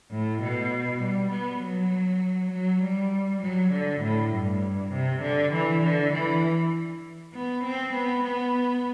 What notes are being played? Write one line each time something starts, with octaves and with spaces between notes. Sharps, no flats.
A2
B2
G3
B3
F#3
F#3
G3
F#3
D3
A2
G2
C3
D3
E3
D3
E3
B3
C4
B3
B3